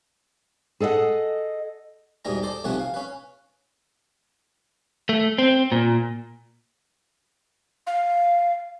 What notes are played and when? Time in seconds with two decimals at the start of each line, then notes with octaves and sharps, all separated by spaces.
0.80 G#4 A4 D#5 E5 F#5
2.25 E2 G#2 B2 E3 G3 A#5
2.43 A4 C5 D5
2.64 B1 C3 E3 F3 A3 F#5
2.80 F5
2.94 C#4 B4
5.09 A3
5.38 C4
5.72 A#2
7.87 F5